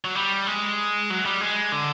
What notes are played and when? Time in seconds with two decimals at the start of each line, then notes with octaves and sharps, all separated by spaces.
0.05 F#3
0.15 G3
0.47 G#3
1.10 F#3
1.25 G3
1.41 G#3
1.72 D3